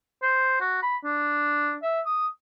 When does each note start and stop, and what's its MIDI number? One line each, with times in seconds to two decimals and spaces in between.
0.22 0.60 72
0.61 0.80 66
0.82 0.96 83
1.04 1.75 62
1.83 2.01 76
2.06 2.26 87